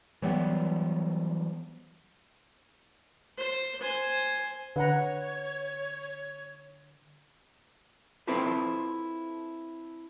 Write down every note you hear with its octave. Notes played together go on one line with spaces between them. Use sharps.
E3 F#3 G3 B3
C5
C5 G#5
D3 B4 C#5 F#5 A#5
C4 E4 F4 A4 B4 C5